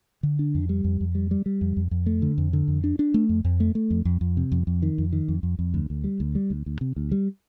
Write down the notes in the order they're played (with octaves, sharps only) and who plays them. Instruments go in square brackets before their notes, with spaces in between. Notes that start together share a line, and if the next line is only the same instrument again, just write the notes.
[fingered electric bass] D3
D4
F2
G3
F2
F2
G3
G3
G3
F2
F2
F2
A3
D3
F2
D3
F2
D4
D4
A3
F2
F2
A3
A3
F2
F2
F2
C3
F2
F2
D#3
F2
D#3
F2
F2
F2
D2
D2
G3
D2
G3
D2
D2
C3
D2
G3